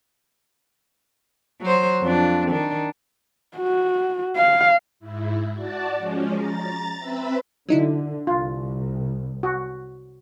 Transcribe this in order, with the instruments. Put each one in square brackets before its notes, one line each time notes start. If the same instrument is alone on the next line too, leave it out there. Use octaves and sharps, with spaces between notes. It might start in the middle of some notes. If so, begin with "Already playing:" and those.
[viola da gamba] F#3 C5
F2 D4
D#3 D4
[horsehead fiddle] F#4
F5
[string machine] G#2 E4
F#4 D5 A5
F3 G#3 C#4
A#5 A6
C4 B4 E5 B5
[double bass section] D3 [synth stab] F#3 D#4 E4
[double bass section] C2 [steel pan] F4
[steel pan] F#4